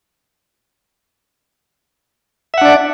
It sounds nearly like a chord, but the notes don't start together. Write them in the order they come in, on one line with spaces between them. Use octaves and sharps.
E5 F#5 D4 D5